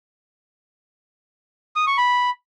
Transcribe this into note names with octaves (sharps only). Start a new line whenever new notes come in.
D#6
C#6
B5